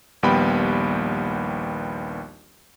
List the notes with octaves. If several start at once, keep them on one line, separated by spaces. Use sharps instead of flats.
A#1 D#2 G3 B3 G5 B5